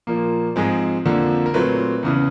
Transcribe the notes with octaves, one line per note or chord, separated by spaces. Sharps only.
A#2 F3 A#3
G#2 F3 G#3 C4
F2 D3 F3 A#3
A#4
A#2 F#3 A3 C4 B4
E2 C#3 E3